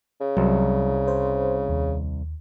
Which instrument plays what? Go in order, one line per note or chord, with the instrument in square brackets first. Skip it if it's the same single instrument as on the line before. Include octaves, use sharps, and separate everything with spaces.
[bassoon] C#3
[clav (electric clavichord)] C2 [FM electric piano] F#3
[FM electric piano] C5
D#2